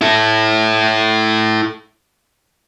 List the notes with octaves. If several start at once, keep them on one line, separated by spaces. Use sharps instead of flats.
E4 A4